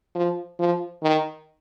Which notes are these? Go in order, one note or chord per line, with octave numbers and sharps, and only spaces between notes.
F3
F3
D#3